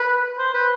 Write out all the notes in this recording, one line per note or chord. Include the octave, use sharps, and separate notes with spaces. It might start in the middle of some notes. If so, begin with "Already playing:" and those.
Already playing: B4
C5
B4